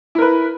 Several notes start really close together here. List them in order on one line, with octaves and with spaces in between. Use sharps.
E4 A#4 B4